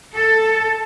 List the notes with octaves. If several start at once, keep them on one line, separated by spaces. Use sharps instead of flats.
A4